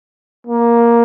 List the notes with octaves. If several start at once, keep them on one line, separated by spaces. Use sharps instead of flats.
A#3